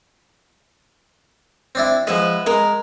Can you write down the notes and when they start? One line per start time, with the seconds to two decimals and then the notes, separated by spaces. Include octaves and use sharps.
1.75 C4 D4 E4
2.07 F3 G#3 B4 E5 F#5
2.46 G#3 A#4